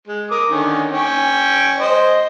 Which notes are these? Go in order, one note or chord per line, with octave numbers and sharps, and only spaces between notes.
G#3
A#4 D6 D#6
D3 D#3 C#4
C#4 G5
C5 D#5